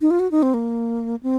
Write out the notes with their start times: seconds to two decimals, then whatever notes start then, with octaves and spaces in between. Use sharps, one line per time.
0.01 D#4
0.11 F4
0.20 F#4
0.31 D#4
0.43 C4
0.54 A#3
1.23 C4